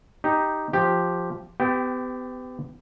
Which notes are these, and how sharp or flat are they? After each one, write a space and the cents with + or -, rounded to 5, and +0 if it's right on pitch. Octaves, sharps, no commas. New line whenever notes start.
D#4 +0 G4 +0
F3 +0 G4 +0
B3 +35 G4 +0 G5 -20